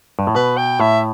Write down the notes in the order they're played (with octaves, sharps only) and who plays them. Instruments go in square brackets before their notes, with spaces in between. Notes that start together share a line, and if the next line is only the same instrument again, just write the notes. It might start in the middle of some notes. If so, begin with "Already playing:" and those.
[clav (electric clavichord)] G2
A2
[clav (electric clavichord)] B2 [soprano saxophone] B4
[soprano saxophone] G5
[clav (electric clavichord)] A2 [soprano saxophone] E5